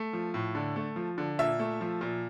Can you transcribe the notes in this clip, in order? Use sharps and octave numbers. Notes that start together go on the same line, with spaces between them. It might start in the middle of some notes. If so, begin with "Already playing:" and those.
Already playing: A3
F3
A2
D3
A3
F3
D3
A#2 E5
A3
F3
A#2